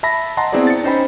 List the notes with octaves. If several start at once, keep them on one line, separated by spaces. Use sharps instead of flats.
E5 A5 B5 A#6
D#5 F#5 A5 A#5 C6
B3 C4 E4 F#4 G#4 D5
A6 C#7
C#4 D#4 C5 G5 B5